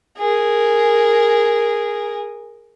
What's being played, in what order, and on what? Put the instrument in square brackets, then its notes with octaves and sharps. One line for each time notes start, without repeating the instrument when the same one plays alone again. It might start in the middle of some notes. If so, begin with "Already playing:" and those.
[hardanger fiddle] G#4 A#4